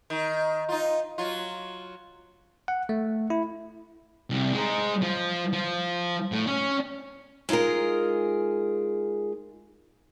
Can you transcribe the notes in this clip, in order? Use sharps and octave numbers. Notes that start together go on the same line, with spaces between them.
D#3
D#4 F4
F#3 F4
F#5
A3
E4
C2
G#3 D#4
F3
F3
A2
C#4
G#3 D#4 F4 G#4 A#4